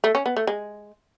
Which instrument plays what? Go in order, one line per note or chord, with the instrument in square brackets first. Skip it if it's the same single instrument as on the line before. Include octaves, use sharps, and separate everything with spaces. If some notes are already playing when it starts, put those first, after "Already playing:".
[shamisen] A3
C#4
B3
A3
G#3